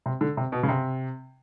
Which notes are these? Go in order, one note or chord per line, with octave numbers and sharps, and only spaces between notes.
C3
D3
C3
B2
C#3
C3